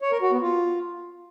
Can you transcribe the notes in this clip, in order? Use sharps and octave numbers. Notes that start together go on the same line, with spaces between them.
C#5
A#4
F#4
B3
F4